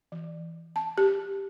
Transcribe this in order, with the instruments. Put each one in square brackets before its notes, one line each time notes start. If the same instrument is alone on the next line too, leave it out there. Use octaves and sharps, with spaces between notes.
[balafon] E3
A5
G4